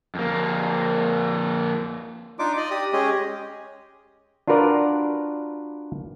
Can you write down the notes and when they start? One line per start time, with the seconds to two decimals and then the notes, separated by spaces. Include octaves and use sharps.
0.15 F2 A#3
2.39 D4 D#4 F4 D6
2.57 D5 D#5
2.71 G4 D#6
2.93 G#3 C#4 G4 G#4 D#5
4.48 D4 F4 F#4 A#4 B4 D5